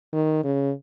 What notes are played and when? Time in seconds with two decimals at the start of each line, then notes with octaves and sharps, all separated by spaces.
0.13 D#3
0.44 C#3